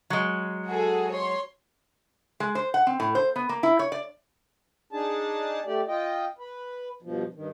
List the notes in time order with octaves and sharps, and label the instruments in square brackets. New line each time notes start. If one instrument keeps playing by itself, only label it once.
[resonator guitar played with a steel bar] F#3 G#3
[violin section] F#4 G#4 A4
C#5 C6
[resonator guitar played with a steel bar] G#3
C5
F#5
C4
A2
C5
B3
A#3
E4
C#5
D5
[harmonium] D4 D#4 G#4 A5
A3 G4 D5
F4 D#5 G5
B4
G2 B2 F3
G2 D#3